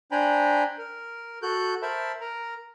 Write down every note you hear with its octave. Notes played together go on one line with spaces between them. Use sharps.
D4 C5 G5 G#5 A#5 B5
A#4
F#4 A4 F#6 G6
A#4 C5 E5 A5 B5
A#4 A#5